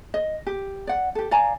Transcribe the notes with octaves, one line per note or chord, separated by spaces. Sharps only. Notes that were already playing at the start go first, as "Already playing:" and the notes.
D#5
G4
D5 F#5
G4 A4
D5 F5 G#5 A#5